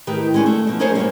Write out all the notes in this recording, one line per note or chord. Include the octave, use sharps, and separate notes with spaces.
A2 D#3 G4 B4
G#3 C#4 D4
A3
B2 F3
C#4 D#4 G#4 A#4 C5 C#5
G2 G3 A#3 C#4 F4